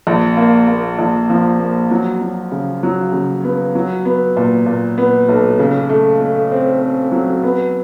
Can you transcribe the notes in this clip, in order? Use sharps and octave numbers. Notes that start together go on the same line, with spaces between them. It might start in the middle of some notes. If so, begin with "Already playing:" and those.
A#1
A#3
A#3
A#1
F3
A#3
F#3
F#3
C#3
F#3
C#3
B3
F#3
B3
A#2
A#2
B3
B1
C#3
A3
A3
C4
C4
F#3
B3